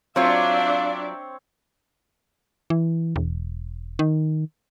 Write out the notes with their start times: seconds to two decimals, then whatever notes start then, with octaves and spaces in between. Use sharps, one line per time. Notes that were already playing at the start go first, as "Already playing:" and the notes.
0.16 F#3 C4 D4 F4 C#5 D5 E5 F5
2.70 E3
3.16 E1
3.99 D#3